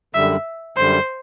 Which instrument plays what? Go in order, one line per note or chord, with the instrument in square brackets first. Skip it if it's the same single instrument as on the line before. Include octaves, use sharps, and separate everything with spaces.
[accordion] F#2 D3 G3 [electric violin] E5
[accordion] F#2 D3 G3 [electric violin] C5